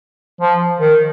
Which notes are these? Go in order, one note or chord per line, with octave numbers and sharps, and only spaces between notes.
F3
D#3